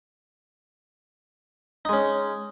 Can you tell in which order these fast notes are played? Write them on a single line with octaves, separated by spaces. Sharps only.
D#4 G#3 C#4